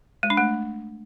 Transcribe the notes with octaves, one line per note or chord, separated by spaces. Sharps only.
G#3
D4
A3